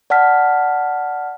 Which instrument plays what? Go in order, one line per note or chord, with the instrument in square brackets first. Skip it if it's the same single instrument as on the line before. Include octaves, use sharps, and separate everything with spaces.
[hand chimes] D5 F#5 A5 F6 B6